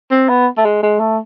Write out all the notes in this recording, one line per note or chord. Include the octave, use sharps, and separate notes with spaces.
C4
B3
A3
G#3
G#3
A3